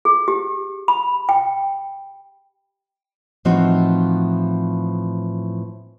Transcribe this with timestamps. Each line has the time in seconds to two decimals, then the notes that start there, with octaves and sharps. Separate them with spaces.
0.05 G#4
0.28 G4
0.88 B5
1.29 G5
3.45 A2 E3 F3 C4 D#4 F#4